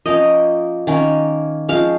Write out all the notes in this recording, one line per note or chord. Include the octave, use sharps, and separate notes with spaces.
F3 A#3 C#4 D#5
D#3 A#3 C#4
F3 G#3 C#4 F5